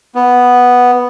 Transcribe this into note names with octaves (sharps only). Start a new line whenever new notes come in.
B3